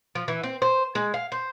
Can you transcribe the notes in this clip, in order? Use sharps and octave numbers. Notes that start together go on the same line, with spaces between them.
F3
E3
C4
C5
G#3
F5
C5